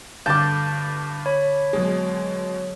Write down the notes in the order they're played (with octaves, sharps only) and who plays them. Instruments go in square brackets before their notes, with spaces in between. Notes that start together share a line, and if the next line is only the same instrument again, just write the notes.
[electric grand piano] G2 [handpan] D3 F5 [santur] A5 D6 [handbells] G6
[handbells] C#5 [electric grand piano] B5
[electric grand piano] B2 G#3 [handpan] F#3 G#4